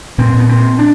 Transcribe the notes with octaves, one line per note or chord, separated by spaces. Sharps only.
A#2 C4
B3
C4
D4